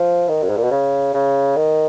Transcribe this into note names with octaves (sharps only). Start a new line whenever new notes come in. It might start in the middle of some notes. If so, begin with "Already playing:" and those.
Already playing: F3
D#3
F#2
G#2
A#2
B2
C#3
C#3
D#3